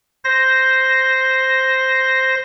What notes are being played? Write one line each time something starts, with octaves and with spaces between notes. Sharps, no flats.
C5 A#6